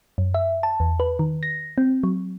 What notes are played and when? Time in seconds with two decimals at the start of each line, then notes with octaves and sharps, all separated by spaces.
0.18 F#2
0.34 E5
0.63 A5
0.80 E2
1.00 B4
1.19 D#3
1.43 A#6
1.78 C4
2.03 F#3